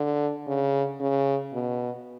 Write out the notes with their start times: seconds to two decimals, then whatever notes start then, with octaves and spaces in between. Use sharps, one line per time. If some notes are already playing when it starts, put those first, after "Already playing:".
Already playing: D3
0.47 C#3
1.00 C#3
1.53 B2